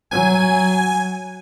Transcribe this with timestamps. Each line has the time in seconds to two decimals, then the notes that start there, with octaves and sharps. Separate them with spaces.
0.11 F#3 G#5